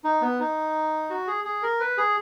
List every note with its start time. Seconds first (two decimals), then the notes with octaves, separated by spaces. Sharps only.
0.04 D#4
0.21 B3
0.40 D#4
1.10 F#4
1.27 G#4
1.45 G#4
1.63 A#4
1.80 B4
1.98 G#4